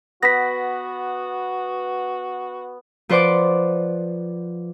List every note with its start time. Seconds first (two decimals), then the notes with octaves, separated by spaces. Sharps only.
0.23 B3 F#4 A#6 B6
3.09 F3 B4 C5 D5 F#5 D6